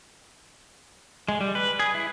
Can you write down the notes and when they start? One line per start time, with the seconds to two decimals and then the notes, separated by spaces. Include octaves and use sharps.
1.28 G#3
1.41 G3
1.55 B4
1.80 G#4
1.94 E4